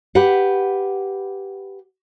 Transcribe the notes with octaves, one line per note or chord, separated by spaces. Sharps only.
G4 B4 F#5